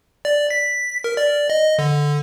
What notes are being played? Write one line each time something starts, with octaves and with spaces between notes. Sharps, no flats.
D5
B6
A#4
D5
D#5
D3